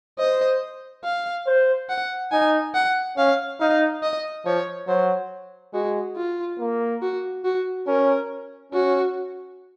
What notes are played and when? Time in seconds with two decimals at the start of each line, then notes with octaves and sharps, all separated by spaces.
0.19 C5 D#5
1.04 F5
1.47 C5
1.90 F#5
2.32 D#4 G#5
2.75 F#5
3.17 C#4 F5
3.61 D#4 F5
4.03 D#5
4.45 F3 C#5
4.88 F#3 C5
5.74 G#3 F#4
6.17 F4
6.60 A#3
7.03 F#4
7.45 F#4
7.87 C#4 A#4
8.73 C#4 F#4